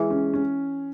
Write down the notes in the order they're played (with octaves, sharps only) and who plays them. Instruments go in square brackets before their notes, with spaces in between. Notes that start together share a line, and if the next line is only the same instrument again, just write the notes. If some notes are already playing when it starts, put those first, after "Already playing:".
Already playing: [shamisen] E3 [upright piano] G#3
[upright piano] C#4
C#4